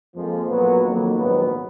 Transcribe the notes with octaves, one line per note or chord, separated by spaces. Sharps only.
F2 F3 G#3 A#3
B1 A#2 F#3 B3
F2 D#3 F#3 A#3
A#1 G#2 D#3 F#3 B3